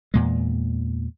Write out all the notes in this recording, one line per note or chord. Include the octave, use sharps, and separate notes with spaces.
E2 A#2 G#3